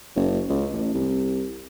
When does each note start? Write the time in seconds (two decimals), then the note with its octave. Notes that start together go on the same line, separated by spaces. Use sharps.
0.16 F#1
0.50 C#2
0.73 A1
0.94 C2